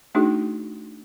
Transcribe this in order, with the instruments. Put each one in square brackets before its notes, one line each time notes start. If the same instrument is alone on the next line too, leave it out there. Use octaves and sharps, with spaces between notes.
[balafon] A3 D4 D#4 F#4 G#4